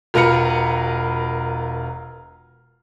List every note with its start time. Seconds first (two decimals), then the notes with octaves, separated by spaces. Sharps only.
0.14 E1 F4 A#4 B4 A#5 C#7